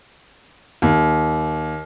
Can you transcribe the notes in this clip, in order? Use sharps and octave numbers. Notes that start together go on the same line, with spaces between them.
D#2